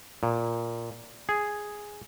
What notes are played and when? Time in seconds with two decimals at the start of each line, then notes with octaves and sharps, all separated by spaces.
0.23 A#2
1.29 G#4